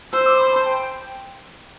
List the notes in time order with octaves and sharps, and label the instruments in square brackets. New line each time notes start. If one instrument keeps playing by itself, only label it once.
[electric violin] C5 [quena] E6
[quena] D6
B5
A5
G5